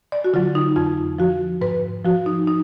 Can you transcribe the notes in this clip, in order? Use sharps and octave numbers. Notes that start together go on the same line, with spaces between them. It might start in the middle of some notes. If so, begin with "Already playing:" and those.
D5
F#4
D3 F#3 F4
D#4
F2 F4
F3 F#4
G#2 B4
F3 F#4
D#4
D#4